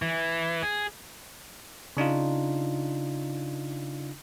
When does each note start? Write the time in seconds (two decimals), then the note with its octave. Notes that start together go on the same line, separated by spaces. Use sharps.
0.02 E3
0.62 G#4
1.97 C#3 D4 D#4 F4